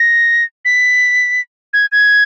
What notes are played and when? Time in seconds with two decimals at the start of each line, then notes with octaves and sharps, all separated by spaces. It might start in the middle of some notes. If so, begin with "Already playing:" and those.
Already playing: A#6
0.65 B6
1.73 G#6
1.92 G#6